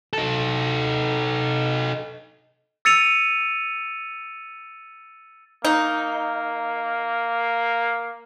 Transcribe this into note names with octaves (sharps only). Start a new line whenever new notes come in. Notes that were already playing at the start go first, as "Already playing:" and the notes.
D#4 A4
E6 A6 C#7 D#7 F7
A#3 D#4